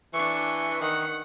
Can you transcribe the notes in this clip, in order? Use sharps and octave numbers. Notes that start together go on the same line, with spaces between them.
E3 D4 C#6
D#3 F#5